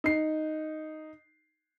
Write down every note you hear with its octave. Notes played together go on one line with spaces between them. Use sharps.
D#4 C7